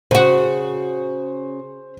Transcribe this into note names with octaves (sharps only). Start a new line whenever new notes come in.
C#3 F#4 C5